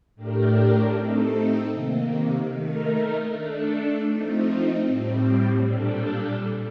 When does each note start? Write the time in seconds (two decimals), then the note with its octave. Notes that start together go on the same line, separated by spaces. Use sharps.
0.15 A2 A3 D4 G4 A#4
0.94 A3 C4 D#4 A4
1.71 C3 D#3 A#3
2.50 D#3 A3 D#4 A#4
3.29 A3 D4 A4
4.07 F3 A3 C4 D#4
4.85 A2 G3 C4
5.64 A#2 G3 D4 A4